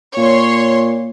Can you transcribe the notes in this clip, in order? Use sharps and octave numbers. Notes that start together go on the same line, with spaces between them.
A#2 C#5 C6